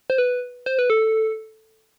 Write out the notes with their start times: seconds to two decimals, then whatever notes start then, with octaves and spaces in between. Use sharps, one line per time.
0.10 C5
0.18 B4
0.66 C5
0.79 B4
0.90 A4